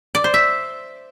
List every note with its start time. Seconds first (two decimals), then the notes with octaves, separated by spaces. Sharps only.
0.15 D5
0.24 C5
0.34 E5